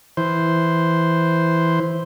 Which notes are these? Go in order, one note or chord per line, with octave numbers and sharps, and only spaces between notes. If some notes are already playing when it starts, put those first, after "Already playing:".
E3 C5